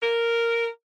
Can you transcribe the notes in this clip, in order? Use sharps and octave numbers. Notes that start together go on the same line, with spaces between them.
A#4